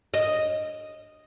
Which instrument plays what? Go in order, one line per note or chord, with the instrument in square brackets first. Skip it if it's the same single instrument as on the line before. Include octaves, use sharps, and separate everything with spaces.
[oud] D#5